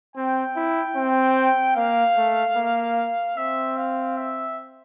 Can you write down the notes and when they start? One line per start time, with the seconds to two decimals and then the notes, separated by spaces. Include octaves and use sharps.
0.16 C4 G5
0.56 E4
0.96 C4
1.76 A#3 F5
2.17 A3
2.56 A#3
3.37 C4 E5
3.77 F5
4.17 E5